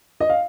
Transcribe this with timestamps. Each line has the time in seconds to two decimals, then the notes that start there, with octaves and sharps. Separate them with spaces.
0.20 D#5
0.30 F5